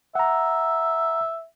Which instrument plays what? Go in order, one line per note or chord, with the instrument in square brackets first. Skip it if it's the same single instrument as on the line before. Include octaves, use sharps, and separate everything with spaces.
[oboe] E5 [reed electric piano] F#5 A#5